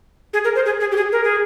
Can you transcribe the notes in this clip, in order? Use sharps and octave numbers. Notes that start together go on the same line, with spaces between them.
G#4
A#4
C5
G#4
G#4
G4
G#4
A#4
G#4